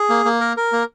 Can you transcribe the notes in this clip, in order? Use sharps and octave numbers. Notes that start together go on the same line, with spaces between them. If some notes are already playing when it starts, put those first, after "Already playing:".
Already playing: G#4
A#3
A#3
A#4
A#4
A#3